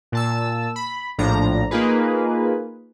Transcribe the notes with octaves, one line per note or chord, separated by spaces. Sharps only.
A#2 A5 E6
B5
A#1 A2 F3 D4 A#5
A#3 D#4 F4 G#4 B4